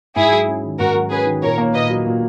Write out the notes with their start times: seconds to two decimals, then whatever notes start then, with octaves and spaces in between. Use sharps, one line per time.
0.16 G#2 E4 G#4
0.31 F#3
0.48 C#4
0.64 D#3
0.79 G#2 F#4 A#4
0.95 F#3
1.11 C#4 G#4 B4
1.26 D#3
1.42 A#2 A#4 C#5
1.58 A#3
1.74 A#2 B4 D#5
1.90 F#3
2.06 A#2